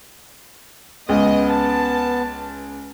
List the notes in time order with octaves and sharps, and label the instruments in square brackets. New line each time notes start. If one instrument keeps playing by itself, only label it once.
[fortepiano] C#2 [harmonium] B3 [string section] D#5
[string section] A5